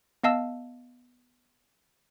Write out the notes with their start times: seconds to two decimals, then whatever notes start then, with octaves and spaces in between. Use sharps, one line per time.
0.24 B3 D#5 F5 A5 E6